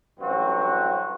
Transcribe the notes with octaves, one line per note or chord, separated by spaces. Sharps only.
A1 G2 F#3 C4 F#4